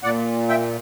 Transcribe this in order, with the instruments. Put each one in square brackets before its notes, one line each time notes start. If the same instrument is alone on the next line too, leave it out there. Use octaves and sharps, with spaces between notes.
[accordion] A#2 D5 F#5
E5 G5